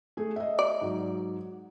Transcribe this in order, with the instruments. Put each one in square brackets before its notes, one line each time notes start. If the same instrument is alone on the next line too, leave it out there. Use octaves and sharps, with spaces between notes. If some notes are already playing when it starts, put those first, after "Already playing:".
[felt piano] A3 G#4
D#5 E5
[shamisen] D5
[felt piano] G#2 F#3